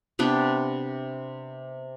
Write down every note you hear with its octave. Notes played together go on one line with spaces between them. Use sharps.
C3 B3 D4 G5